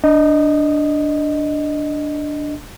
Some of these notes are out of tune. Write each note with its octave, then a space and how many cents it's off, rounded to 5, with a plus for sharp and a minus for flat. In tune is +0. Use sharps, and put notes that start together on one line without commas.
D4 +0 D#5 +0